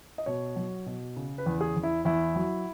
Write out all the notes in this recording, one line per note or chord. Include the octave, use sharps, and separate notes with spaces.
D#5
B2 C#5
F#3
B2
C#3
B4
E2
G#4
E2
E4
E2 E4
F#3